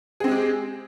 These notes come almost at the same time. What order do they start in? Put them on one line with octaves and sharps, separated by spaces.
G#4 C4 G#3 G4